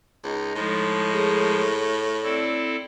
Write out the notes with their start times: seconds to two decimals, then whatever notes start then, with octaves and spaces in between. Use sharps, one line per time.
0.24 C#2 D#4
0.55 A2 F3 G#3
1.10 G#4 A#4 C#5
1.75 C#5
2.23 C4 E4 A4 D5